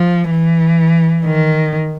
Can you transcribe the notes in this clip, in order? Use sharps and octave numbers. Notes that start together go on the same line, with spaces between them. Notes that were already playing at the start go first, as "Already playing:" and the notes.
Already playing: F3
E3
D#3